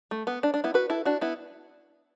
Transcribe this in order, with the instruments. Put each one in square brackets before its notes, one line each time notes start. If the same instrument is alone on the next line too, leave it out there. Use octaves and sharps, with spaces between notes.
[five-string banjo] A3
B3
D4
D4
B3 E4
F#4 B4
E4 A4
D4 F#4
B3 E4